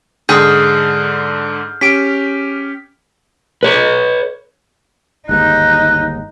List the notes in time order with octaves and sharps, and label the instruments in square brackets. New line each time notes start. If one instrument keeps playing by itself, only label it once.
[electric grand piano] G#2 D3 [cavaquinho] G#4 [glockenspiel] D#6 F6 G6
[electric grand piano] C#4 G4 D7 [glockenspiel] B6
[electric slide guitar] B4 C#5
[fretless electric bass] G1 D#2 G#2 [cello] D#4 [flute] F#6